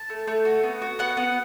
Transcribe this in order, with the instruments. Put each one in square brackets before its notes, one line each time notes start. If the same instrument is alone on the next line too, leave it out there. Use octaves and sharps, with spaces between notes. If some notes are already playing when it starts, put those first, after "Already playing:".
Already playing: [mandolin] A5
A3
A3
F#4
B3
F#4
B3 F#5
B3